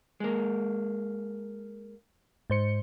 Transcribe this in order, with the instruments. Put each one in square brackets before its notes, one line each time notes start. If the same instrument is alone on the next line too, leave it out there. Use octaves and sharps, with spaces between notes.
[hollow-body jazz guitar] G#3 A#3
[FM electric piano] G#2 C5 C#7